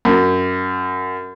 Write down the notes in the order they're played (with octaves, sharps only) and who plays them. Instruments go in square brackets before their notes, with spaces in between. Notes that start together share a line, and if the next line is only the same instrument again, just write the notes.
[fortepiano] F#2